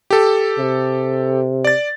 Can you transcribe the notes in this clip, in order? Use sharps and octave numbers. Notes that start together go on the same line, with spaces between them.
G4 A4
C3
D5 A6